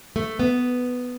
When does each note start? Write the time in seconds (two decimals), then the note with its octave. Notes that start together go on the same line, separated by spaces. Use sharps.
0.16 A3
0.39 B3